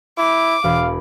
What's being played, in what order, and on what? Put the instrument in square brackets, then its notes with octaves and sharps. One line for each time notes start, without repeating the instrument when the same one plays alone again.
[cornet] E4 [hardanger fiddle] D6
[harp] E1 B5 D7 [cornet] F5